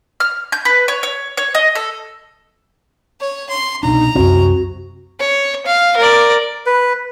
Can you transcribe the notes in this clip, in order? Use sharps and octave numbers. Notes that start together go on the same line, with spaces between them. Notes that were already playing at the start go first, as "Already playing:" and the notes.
F6
G6
B4
C#5
C#5
C#5
D#5
A4
C#5
C6
C2 B2 D4 D#4 A#5
C2 F#2 C4 F#4
C#5
F5
A#4 D5
B4